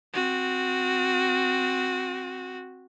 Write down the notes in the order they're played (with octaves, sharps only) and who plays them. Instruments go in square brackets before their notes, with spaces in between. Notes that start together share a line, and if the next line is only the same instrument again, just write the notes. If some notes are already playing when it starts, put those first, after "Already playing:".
[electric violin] C4 F#4